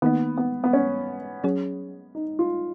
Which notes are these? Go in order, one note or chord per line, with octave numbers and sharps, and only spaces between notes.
D#3 A#3 B3 D#4
B3
B3
C#4
F#3 C#4 G#4 C#5
D#4
F4